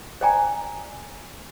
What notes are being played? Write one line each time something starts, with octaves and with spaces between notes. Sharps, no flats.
C5 D5 G5 G#5 A#5